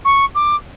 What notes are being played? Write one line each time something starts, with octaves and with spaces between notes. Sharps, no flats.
C#6
D6